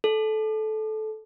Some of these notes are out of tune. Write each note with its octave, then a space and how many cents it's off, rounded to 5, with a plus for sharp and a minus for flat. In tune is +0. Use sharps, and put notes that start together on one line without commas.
A4 -20